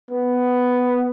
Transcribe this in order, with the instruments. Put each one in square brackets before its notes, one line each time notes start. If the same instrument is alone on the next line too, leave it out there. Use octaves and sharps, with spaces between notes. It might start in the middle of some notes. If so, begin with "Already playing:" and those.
[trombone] B3